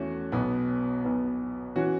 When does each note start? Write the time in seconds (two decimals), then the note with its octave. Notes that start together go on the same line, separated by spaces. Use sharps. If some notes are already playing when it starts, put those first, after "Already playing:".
Already playing: E2 E3 A3 C#4 F#4
0.32 B1 B2 B3
1.04 B1 B2 B3
1.76 E3 C#4 F#4